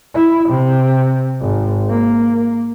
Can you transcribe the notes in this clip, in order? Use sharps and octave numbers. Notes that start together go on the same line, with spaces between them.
E4
C3
G#1
A#3